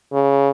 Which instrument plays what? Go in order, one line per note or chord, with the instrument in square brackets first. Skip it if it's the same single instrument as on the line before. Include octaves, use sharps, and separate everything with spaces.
[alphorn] C#3